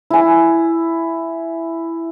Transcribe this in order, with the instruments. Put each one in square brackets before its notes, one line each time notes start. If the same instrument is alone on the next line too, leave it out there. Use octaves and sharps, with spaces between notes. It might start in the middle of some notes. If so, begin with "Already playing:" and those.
[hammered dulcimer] E4 G#5